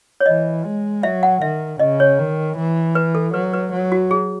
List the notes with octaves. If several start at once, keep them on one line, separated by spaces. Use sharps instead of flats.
C#5
E3 D#5
G#3
F#3 E5
F#5
D#3 E5
C#3 D#5
C#5
D#3
E3
B4
A4
F#3 B4
B4
F#3
F#4
G#4